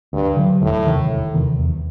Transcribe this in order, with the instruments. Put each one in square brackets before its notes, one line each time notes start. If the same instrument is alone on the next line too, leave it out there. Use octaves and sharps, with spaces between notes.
[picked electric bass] D2 [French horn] G2
[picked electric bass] D3 F#3
[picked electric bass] E1 [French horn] A2
[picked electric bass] E2 C3 D#3
E1
E2 C3 D#3
E2